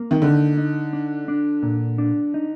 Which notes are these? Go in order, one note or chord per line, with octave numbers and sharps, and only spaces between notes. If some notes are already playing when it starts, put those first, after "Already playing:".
Already playing: A#3
D#3
D3 D#4
D#4
D4
D4
A#2
D4
D#4